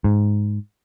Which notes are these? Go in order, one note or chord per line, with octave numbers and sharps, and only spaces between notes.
G#2